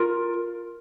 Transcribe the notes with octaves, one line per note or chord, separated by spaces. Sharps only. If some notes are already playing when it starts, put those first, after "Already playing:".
Already playing: F4 A#4